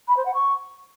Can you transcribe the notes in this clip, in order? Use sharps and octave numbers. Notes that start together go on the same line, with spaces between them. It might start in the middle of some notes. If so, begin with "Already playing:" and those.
B5
C5
F#5
C#6